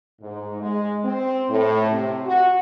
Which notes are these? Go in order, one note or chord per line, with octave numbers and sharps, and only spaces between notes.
G#2
G#3
C4
A2
C3
F#4